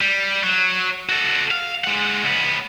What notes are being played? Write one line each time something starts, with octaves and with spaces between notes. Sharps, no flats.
G3
F#3
F#4 A4
F5
G#3 F#5
C#2 B3